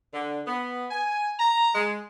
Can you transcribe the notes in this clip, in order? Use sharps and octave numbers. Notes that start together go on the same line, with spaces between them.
D3
B3
G#5
A#5
G#3